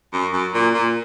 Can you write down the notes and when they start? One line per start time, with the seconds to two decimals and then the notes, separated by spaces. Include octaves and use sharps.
0.13 F#2
0.33 F#2
0.53 A#2
0.74 A#2